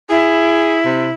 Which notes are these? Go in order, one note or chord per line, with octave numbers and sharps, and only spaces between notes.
E4 G#4
C3